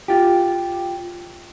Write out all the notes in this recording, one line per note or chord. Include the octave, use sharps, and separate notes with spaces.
F4 G4